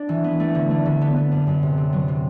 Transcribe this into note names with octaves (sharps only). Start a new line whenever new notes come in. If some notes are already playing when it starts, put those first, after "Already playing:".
Already playing: D4
E3
B3
A3
D3
A3
D3
B3
B3
F#2
F#2
C3
C3
F#3
C3